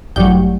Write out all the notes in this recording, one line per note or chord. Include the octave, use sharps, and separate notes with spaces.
A1 G2 F#3 G5